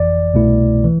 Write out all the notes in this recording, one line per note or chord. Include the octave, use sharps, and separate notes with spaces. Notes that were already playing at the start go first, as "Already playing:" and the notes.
Already playing: G1 F2 E3 D5
C2 B2 A3 E4
E3